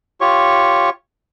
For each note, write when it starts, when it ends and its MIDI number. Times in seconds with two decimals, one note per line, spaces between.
0.21 0.90 65
0.21 0.90 67
0.21 0.90 73
0.21 0.90 85